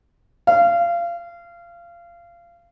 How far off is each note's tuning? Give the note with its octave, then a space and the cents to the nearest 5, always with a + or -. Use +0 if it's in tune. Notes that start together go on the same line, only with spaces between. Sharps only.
F5 -25